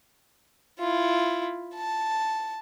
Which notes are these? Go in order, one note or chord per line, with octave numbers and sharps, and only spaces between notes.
E4 F4
A5